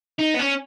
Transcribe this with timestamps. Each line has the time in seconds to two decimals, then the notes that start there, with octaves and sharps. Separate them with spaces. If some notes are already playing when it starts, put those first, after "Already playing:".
0.19 D#4
0.35 B3
0.40 C#4